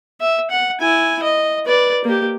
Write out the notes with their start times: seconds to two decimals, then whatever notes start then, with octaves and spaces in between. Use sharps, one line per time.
0.21 E5
0.51 F#5
0.81 E4 G#5
1.23 D#5
1.66 B4 D5
2.05 A#3 G4